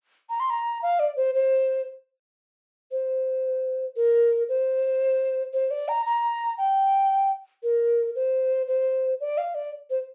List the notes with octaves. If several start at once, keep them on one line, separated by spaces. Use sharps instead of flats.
A#5
C6
A#5
F5
D5
C5
C5
C5
A#4
C5
C5
D5
A#5
A#5
G5
A#4
C5
C5
D5
F5
D5
C5